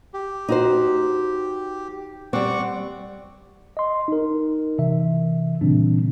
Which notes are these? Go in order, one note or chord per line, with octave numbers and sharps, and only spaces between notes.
G4
D#4 F#4 C5
G3 C4 F#5 C#6 D6
D#5 C6
D#4 A#4
C3 E3 E5
A#2 C#3 E3 G3 C4 D4